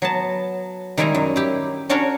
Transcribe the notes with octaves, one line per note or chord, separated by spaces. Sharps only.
F#3 B3 A5
D#3 G3 G#3 E4 G#5 A#5
F#2
E4 G4
C#4 D4 F#4 A#4 C#5